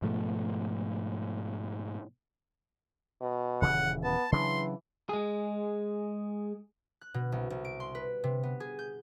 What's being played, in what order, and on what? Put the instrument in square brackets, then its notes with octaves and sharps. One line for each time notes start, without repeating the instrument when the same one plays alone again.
[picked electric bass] G#2 B2 F3 A3
[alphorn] B2
[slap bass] D#1 C#3 E3 [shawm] F#5
[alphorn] B3 [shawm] A5
[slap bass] C#3 F#3 D4 [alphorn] E3 [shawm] C6
[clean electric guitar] G#3 G#4
[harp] F#6
B2
C2
C2
D7
C6
B4
C3
B3
G#4
G6